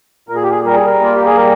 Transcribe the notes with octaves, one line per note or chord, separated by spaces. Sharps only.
A#2 A#4
G#4
G4
G#4
G3 A#4
G#4
A#4
A#3 F4
G4
G#4
G3 A#4